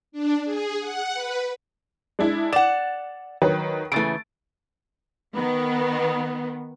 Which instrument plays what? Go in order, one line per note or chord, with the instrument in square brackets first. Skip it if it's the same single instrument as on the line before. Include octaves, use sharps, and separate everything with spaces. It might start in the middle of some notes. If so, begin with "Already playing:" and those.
[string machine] D4
G#4
F#5
B4
[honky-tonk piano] G#3 D4 E4
[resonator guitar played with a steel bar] D5 F#5 [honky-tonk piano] E7
[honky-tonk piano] D#3 F#3 B4
[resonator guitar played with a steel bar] C#3 E3 [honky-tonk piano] A3 A6 D7
[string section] D#3 B3